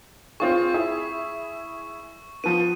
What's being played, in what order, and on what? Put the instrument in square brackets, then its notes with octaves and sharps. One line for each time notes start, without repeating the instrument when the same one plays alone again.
[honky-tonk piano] C4 F4 G#4 [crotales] C#6
[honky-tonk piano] E4 G#4 E5
[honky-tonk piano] F3 B3 [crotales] D#7